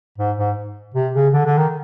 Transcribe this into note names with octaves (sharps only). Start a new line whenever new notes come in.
G#2
G#2
C3
C#3
D3
D3
D#3